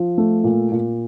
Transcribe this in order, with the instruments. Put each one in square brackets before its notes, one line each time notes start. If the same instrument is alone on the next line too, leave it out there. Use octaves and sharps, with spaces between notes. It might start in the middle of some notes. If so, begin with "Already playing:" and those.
Already playing: [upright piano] F3
A3
A#2
A#2